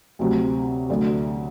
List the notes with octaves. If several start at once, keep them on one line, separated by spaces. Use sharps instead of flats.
D2 C3 F#3
D2 D3 F#3 A3